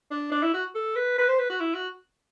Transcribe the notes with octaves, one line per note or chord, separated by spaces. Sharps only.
D4
D4
E4
F#4
A4
B4
B4
C5
B4
F#4
E4
F#4